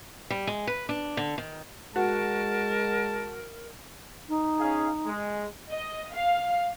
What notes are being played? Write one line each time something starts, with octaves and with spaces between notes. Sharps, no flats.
G3
G#3
B4
D4
D3
D#3
G#3 F#4 A#4 A5
D#4
C#4 G#4 F5
G#3
D#5
F5